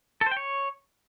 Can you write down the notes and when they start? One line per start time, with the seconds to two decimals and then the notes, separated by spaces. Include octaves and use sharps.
0.21 A4
0.26 C5
0.31 G5
0.37 C#5